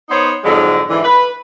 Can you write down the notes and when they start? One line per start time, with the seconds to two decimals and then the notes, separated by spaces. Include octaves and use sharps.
0.09 B3 D#4 C5 C#5
0.44 F2 G#2 D3 F#3 G#3
0.90 G#2 D3 E3
1.04 B4